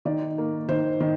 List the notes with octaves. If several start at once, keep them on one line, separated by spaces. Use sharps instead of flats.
D#3 D5
A#3
D#3 C5
D#3